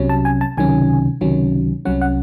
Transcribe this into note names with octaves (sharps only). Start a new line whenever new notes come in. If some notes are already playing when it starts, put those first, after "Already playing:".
Already playing: C2 C3 F#3 C#4
A5
G#5
A5
C#2 C3 D#3 F#3 C#4 G#5
C#2 C3 D#3 F#3 C#4
C2 C3 F#3 C#4 F#5
F#5